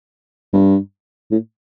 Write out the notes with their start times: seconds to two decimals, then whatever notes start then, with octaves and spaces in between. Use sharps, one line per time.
0.53 G2
1.31 A2